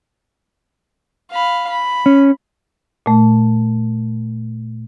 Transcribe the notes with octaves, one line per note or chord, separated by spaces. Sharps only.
F5 B5
B5
C#4
A#2 A3